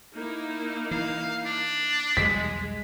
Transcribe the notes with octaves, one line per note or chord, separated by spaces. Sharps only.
A#3 D#4 E4
E3 F5
D4
B1 E2 G3 G#3 B6